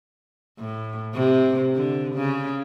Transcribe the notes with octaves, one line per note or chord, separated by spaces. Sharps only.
A2
C3
D3
C#3